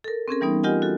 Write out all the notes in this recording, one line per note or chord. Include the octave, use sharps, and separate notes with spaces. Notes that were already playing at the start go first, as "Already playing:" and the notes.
A4 A#4
C4 C#4 G#4 A#4
E3 G3 B3 D#4
F4 G4 A#4 D#5 F#5 G#5
F#4 A4